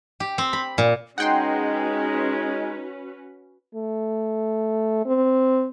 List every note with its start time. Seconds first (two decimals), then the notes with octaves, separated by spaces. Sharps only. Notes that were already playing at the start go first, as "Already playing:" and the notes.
0.20 G4
0.38 C4
0.53 B5
0.78 A#2
1.18 G#3 C#4 D#4 F#4 B4 F#5 G5 C6
3.75 A3
5.05 C4